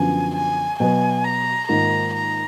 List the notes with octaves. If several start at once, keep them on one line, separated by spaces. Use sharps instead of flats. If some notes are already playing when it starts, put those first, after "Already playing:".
Already playing: F#2 D3 F3 B3 G#5
G#5
B2 F#3 B3 G#5
A#5
G#2 D#3 A#3 F4 A#5
A#5